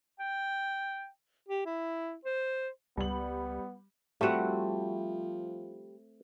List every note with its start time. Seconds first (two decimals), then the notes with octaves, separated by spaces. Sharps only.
0.20 G5
1.49 G4
1.66 E4
2.25 C5
2.97 C#2 G3 B3 F#7
4.21 F3 G3 A3 C4 F#4 F#5